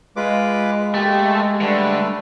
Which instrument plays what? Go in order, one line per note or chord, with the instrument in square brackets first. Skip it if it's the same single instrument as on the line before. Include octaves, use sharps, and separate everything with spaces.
[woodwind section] G#3 [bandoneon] F4 B4 D6
[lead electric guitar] A3 [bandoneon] A#3 [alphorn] G4
[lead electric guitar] D3 [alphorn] G3 [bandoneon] A3 B4